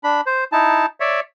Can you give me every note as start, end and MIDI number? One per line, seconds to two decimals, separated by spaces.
0.04 0.21 62
0.04 0.21 83
0.26 0.44 72
0.52 0.86 63
0.52 0.86 64
0.52 0.86 81
1.00 1.20 73
1.00 1.20 74
1.00 1.20 76